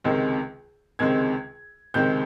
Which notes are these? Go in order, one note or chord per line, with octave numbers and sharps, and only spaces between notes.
C#2 C3 D#3 G#3 C4
C#2 C3 D#3 G#3 C4 G#6
C#2 C3 D#3 G#3 C4 G6